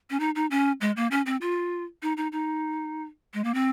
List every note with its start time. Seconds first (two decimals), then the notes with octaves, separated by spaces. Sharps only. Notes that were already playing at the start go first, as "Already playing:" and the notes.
0.10 C#4
0.20 D#4
0.36 D#4
0.51 C#4
0.81 G#3
0.97 A#3
1.11 C#4
1.26 C4
1.41 F4
2.02 D#4
2.17 D#4
2.32 D#4
3.34 G#3
3.44 A#3
3.54 C4